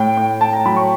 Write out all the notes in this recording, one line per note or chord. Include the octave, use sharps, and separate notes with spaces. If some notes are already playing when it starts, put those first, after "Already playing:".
Already playing: A2 G5
A2
A2 A5
A#5
F#3 B5
C#6